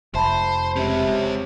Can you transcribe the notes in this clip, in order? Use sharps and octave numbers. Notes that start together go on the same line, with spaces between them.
F1 C5 E5 A5 B5
C3 G#3 C#4